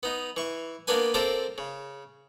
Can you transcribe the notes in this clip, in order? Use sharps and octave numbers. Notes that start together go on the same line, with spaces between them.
B3 D#4
E3 C#6
A#3 B3 D4 B4 G#5
C4 F4 A4 A#4 D5 A5
C#3